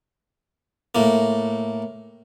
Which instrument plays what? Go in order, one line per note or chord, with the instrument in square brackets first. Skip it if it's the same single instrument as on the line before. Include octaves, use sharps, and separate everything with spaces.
[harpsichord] A2 A#3